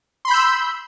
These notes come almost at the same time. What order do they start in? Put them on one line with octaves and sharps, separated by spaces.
C6 B5 G6 E6